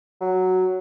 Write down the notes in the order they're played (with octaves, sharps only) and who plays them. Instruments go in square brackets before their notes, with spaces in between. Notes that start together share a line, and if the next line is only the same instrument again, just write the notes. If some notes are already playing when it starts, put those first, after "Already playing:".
[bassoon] F#3